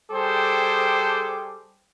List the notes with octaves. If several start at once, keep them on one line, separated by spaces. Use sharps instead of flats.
G3 G#4 A4 C5 G5 D6